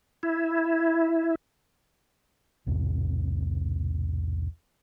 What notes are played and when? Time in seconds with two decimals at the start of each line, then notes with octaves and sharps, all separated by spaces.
0.23 E4
2.66 B1 E2 G#2 C3